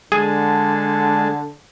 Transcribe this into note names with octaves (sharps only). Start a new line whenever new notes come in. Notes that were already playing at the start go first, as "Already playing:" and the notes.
D3 G#3 G#4 A5